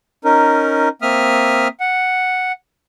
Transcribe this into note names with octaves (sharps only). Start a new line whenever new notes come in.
C#4 D#4 A#4
A#3 C4 E5 D#6 F6
F#5